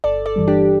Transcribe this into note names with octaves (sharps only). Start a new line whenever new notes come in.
G1 A4 D5
A4 D5
G2 E3 G3
D4 G4